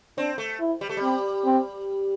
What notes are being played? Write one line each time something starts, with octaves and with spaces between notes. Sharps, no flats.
C4 D4
A3
E4
G3
A3
G3
C4
C4